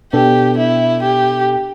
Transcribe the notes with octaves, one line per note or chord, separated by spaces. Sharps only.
B2 B3 D4 G4 A4
E4
G4